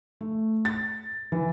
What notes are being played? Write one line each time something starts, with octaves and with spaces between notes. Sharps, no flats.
A3
A6
E3